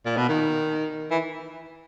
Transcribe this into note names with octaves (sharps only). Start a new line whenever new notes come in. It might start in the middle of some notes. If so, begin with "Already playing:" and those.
A#2
B2
D#3
E3